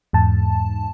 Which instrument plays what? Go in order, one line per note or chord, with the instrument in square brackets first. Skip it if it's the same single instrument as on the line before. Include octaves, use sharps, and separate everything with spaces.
[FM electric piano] E2 G#2 A5